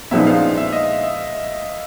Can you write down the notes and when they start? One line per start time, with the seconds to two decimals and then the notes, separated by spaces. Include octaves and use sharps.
0.11 A#2 F3 G#3 B3 D#4 E5
0.27 F5
0.58 E5
0.73 D#5
1.03 E5